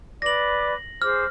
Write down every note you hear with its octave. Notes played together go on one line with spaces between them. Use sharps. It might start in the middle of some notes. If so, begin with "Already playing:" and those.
B4 D5 D6 A#6 F#7
G#4 C5 D6 F6